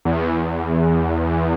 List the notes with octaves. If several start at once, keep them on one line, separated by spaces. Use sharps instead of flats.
E2